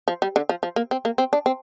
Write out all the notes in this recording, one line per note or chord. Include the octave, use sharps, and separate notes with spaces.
F3
G3
D3
F3
F3
A#3
C4
A#3
C4
D4
C4